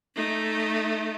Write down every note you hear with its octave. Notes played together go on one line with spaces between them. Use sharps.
A3 D#4